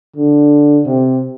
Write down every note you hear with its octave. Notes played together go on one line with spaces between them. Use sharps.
D3
C3